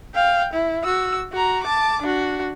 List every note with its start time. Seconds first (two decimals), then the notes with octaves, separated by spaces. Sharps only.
0.15 F5 G5
0.53 E4
0.84 F#4 E6
1.32 F#4 A#5
1.63 A5 D6
2.02 D4 F#4